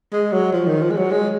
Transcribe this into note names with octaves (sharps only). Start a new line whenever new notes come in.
G#3
F#3
F3
D#3
F3
G#3
F#3
G#3